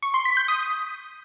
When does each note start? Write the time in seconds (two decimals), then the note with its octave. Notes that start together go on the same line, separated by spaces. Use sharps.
0.03 C#6
0.14 C6
0.25 B6
0.37 G6
0.48 D#6